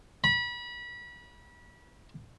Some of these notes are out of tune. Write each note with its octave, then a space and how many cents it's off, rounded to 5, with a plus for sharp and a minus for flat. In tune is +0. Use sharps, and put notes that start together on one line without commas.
B5 -30